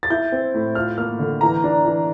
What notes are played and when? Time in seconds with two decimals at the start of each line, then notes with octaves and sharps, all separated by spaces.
0.03 A6
0.10 E4 G6
0.32 C4
0.54 A2
0.75 F4 F6
0.98 A#3 F6
1.19 D3
1.41 E3 A#5
1.64 D4
1.85 E3